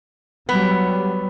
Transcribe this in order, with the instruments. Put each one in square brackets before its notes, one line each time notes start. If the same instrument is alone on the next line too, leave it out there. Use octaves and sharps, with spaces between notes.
[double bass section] F#3 G3 [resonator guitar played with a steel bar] B3